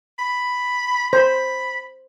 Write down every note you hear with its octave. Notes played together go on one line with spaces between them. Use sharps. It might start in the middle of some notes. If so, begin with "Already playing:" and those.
B5
C5 B5